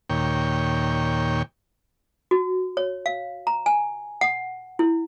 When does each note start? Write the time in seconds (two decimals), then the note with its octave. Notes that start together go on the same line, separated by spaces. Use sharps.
0.10 D#2 A#2 C#5 G5
2.31 F#4
2.77 C#5
3.06 F5
3.47 A#5
3.66 G#5
4.21 F#5
4.79 E4